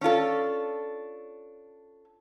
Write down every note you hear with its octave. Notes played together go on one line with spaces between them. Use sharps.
C#4 D4 F4 A4